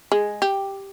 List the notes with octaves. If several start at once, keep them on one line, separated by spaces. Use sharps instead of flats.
G#3
G4